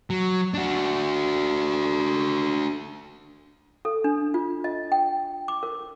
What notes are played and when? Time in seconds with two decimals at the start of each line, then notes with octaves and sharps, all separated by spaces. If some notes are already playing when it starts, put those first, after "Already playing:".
0.10 F#3
0.54 D4 F#4
3.85 A4
4.04 D4
4.34 F4
4.64 D#5
4.92 G5
5.48 D6
5.63 A#4